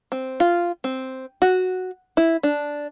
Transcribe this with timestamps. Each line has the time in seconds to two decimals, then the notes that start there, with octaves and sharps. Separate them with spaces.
0.12 C4
0.40 F4
0.84 C4
1.42 F#4
2.17 E4
2.43 D4